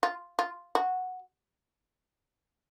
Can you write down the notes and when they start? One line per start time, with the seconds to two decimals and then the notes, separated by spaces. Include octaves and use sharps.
0.03 F4
0.39 F4
0.75 F#4